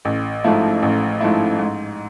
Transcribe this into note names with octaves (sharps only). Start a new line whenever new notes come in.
A1
G#2 F3 A3 E4
A1
G#2 F3 A3 E4
G#2